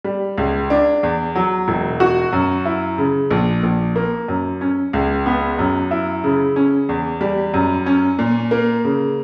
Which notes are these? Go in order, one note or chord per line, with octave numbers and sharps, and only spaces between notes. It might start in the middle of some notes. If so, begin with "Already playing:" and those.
G3
C#2
D4
E2
F#3
E1
F#4
F#2
E4
C#3
A#1
A#1
A#3
F#2
C#4
C#2
B3
F#2
E4
C#3
C#4
E2
G3
F#2
C#4
A#2
A#3
C#3